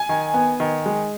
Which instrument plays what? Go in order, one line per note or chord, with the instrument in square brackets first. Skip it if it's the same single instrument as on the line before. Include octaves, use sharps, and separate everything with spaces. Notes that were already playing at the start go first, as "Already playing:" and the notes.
Already playing: [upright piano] G#5
D#3
B3
D#3
G#3